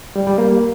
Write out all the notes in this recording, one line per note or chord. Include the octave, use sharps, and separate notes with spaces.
G3
G3
A#3